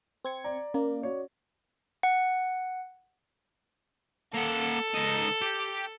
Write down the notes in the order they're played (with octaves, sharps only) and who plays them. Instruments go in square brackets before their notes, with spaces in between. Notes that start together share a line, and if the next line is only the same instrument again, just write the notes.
[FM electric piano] C4 G#6 C#7
[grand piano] D5 A#5
[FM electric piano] A#3 [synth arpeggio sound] C#4
[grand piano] F#4 C#5 D5
[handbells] F#5
[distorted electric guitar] A#3 F#5 [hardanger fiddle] A4
[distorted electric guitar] C#2 D#4
G4